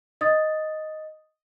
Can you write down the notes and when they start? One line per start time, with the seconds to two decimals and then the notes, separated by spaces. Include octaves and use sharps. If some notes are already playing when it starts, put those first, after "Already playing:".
0.21 D#5 D#6 A6